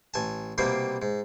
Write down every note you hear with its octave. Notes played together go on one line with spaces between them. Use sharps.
A1 G#5 A5
C2 B2 G3 A#3 C4
G#2